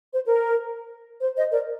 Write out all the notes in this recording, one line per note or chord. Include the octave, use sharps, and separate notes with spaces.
C5
A#4
C5
C5 D#5
A#4 D5